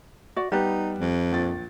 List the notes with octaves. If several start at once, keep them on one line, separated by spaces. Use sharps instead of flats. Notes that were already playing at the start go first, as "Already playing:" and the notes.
F#4 D5
G3 B3 D#4 G4 F#6
F2
A#1 A6